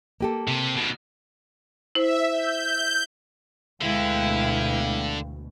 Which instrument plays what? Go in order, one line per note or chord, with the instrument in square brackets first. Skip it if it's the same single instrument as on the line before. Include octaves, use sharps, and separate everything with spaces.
[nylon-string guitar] A#3 G4 A4
[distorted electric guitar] C3
B2 D#3
[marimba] E4 C5 [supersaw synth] E5
[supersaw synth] G6
[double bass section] D2 B2 [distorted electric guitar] D3 [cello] G#3 E4 [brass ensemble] B4 F5 G5